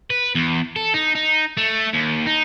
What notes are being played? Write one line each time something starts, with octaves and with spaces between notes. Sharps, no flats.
B4
E2
A4
D#4
D#4
A3
D#2
D#4